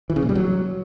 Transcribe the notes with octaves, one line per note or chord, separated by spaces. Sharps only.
E3
C#3
A#2
G3
F#3